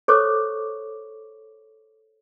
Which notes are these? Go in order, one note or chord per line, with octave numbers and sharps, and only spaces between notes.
A4 C5 C#5 C#6 D6